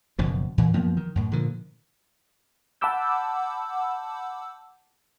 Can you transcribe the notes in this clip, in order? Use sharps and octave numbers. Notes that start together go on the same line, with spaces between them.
F#1 F#2 B2 F3
A#2 E3
F#2 F3 A#3 B3
D#3
F#2 A2
A#2 D3 D#3 F3
F#5 A5 B5 D6 E6 G6